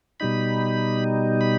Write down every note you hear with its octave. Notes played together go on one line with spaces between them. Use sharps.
B2 G3 D#4 B5
B5